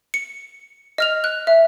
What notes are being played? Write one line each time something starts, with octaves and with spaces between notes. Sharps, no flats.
C#7
D#5 F6 F7
F#6
E5